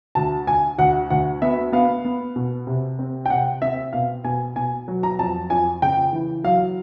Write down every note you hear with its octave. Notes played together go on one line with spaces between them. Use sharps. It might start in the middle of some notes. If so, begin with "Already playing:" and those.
D2 A5
D2 G#5
D2 F#5
D2 F#5
B3 E5
B3 F5
B3
B2
C3
C4
G5
C3 F#5
C4 E5
B2 F5
B2 G#5
B2 G#5
F#3
A#5
F2 A5
F2 G#5
C#3 G5
E3
F#3 F5